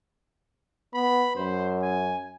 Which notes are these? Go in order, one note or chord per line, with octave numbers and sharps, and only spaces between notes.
B3 B5
F#2 C5
G#5